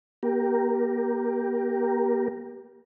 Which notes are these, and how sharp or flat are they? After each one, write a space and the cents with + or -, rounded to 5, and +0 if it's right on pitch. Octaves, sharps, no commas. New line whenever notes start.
A#3 +40 G4 +0 A#4 +0